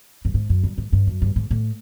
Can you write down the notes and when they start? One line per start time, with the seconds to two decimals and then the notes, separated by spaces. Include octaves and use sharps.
0.25 G2
0.34 G#2
0.50 F#2
0.63 G2
0.78 G#2
0.92 G2
1.07 F#2
1.22 G2
1.36 G#2
1.51 A2